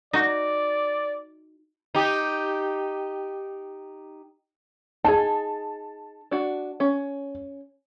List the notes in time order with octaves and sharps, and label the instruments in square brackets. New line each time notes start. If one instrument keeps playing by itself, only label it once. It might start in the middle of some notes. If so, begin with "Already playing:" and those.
[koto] D#4 F#4 [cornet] D5
[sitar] D#4 G4
[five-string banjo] D#4 G#4 [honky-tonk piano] A5
[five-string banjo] D4 F#4
C#4